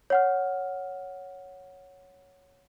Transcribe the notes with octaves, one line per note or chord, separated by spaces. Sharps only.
C#5 F#5 F6